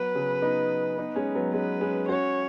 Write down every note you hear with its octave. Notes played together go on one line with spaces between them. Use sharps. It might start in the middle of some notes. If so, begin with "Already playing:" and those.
Already playing: F#3 B3 B4
C#3 F#3
B3 D#4
B3 D#4
G#3 C#4
F#3 B3
G#3 C#4 B4
G#3 C#4
C#4 F#4 C#5